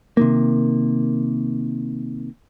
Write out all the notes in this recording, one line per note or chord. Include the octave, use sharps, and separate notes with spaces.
C3 D#3 A#3